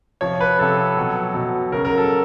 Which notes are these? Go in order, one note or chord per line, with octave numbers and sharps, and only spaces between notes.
C3 F3 C#5
B4
C3 F3 A4
B2 F#3
B2 F#3
C#3 F#3 A#4
A#4
A4